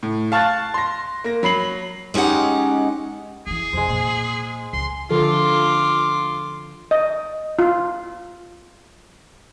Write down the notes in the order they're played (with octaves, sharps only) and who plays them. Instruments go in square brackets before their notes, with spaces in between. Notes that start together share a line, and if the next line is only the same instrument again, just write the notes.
[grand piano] A2
F5 A5 C#6 F6 F#6 A6
C6 A#6
A#3 A#6
F#3 B5 C7 F#7
[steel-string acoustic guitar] G#3 C#4 D#4 G4 F#5
[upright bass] E3 F#3 [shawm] G#4
[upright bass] F2 C3 [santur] G#3 C5
[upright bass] A#2
[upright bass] C#2 [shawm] C6
[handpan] D3 F3 A4 [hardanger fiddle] F4 D6
[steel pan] D#5
F4